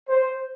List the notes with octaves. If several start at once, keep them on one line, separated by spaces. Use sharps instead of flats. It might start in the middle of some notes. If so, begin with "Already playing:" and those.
C5